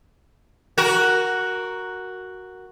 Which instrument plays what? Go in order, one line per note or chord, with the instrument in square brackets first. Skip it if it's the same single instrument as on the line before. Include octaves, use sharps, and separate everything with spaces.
[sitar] F#4 A#4